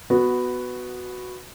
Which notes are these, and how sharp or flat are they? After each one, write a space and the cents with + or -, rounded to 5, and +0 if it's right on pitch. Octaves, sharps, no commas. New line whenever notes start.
B3 +5 F#4 -5